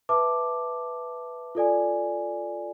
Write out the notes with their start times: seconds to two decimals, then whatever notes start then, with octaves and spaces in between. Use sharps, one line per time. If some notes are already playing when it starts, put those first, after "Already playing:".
0.09 B4 E5 A5 D6
1.55 F4 A4 D5 G#5